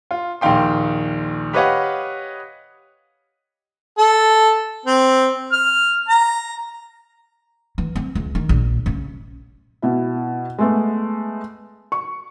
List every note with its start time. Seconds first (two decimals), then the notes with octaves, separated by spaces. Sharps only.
0.11 F4
0.41 A#1 D#2 D#3 F5 G5 C6
1.53 G4 B4 C#5 D#5 F5 F#5
3.98 A4
4.85 C4
5.52 F6
6.09 A#5
7.78 E3
7.96 C4
8.15 C#2
8.35 D#3
8.49 A#1
8.86 C#3
9.82 B2 E4
10.58 G#3 A3 B3
11.92 C#6